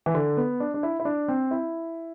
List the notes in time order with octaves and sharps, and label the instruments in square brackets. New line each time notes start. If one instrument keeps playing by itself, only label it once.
[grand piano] E3
D3
B3
D4
D4
E4
E4
D4
C4
E4